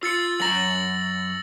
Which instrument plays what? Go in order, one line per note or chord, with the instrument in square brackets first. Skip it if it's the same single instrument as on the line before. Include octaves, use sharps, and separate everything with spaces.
[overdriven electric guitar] F4 [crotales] E6 A6 C#7
[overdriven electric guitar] F#2 A#5 [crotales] A#6 F#7